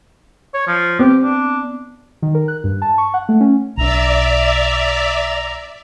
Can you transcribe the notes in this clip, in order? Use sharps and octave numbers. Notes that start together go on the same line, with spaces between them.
C#5
F3
B3 C4 G4
D4
D#3
A#4
F#6
G2
A5
C#6
F#5
A3
C#4
B1 D4 D5 E5 A#5